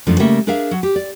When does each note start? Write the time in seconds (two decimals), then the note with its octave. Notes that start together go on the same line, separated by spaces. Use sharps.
0.07 F#2 F3 A3 D4
0.19 C#3 G3 A3 A#3 E5
0.47 D4 G#4 A#4 E5 F5
0.71 F#3
0.83 G4
0.96 D5